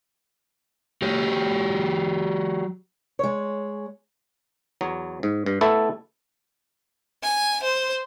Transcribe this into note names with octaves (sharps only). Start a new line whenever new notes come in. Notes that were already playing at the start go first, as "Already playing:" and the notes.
F#3 G4 C#5
G#3 C#5
E2 F#3
G#2
G2
A3 B3 E4 A4
G#5
C5